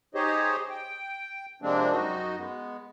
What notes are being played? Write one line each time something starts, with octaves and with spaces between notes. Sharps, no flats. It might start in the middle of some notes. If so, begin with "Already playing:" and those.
D#4 G4 G#4 C5 C#5 D#5
G5
C3 F3 G#3 A#3 C4 D4
F#2 D#4 F#4 D#5
G#3 B3